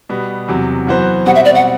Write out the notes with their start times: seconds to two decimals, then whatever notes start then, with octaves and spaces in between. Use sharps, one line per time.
0.09 B2 G3 B3
0.48 E2 C3 F#3
0.87 F#2 E3 B3 F#4 C5
1.26 B2 G3 C4 F#4 F#5
1.35 E5
1.45 D5
1.55 F#5